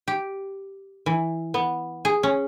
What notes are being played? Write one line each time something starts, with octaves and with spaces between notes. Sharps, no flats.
G4
E3
B3
G#4
C#4